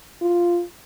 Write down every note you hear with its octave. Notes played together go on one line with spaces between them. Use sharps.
F4